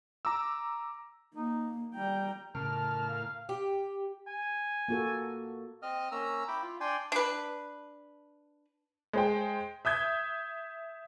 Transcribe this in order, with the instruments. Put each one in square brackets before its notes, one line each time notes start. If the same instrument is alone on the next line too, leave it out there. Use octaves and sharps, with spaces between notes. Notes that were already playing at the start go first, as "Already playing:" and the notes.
[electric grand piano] A#5 D6 E6
[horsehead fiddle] A#3 [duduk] D#4
[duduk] G3 [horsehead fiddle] G5 A#5
[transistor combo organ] A2 A#4 F6 [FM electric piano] C#3 [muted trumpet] A5
[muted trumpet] F5
[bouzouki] G4
[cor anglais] G#5
[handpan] A#3 F#4 A4
[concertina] C4 D#5 F6
A#3 C#4 A#5 E6
E4 G5 B5 D6
F4
D4 D5 G5 G#5 C6
[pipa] D4 B4
[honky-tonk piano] G#3 C5 G5
E5 D#6 G6 G#6